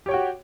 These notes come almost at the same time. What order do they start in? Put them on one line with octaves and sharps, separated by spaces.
G4 C#5 G5 F#4